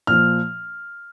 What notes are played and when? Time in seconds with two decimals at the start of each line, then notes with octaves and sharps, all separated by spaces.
0.07 A#2 F3 F6